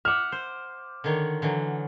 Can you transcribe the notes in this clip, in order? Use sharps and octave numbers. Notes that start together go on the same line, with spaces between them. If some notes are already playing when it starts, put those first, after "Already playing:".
E5 F#5 D6 F6
C5
D3 D#3 C#5
D3 E3 F#3